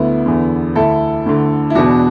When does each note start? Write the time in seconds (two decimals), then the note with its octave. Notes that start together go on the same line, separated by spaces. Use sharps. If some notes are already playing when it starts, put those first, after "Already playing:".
Already playing: D2 D3 B3 E4
0.26 E2 D3
0.75 D2 D3 E4 A4
1.26 D2 D3
1.70 E4
1.75 E2 B2 D4 F#4